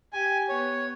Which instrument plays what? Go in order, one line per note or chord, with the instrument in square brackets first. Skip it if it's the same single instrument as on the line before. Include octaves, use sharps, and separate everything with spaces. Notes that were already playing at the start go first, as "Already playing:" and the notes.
[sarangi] G4 [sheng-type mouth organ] G#5
[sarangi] B3 [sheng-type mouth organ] C#5